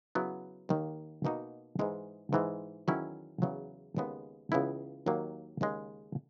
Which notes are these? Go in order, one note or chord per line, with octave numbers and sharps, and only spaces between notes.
C#3 F#3 B3 E4
D#2 D#3 A#3
B2 A#3 D#4 F#4
G#2 E3 G#3 D#4
G#2 E3 G#3
E2 D#3 F#3 C#4 E4
E2 C#3 F#3
D#2 C#3 G#3 B3
C#2 C#3 E3 B3 E4
D#2 D#3 F#3 A#3
D#2 C#3 G#3